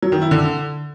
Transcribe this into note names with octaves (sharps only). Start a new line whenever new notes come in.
F#3
D#3
E4
D3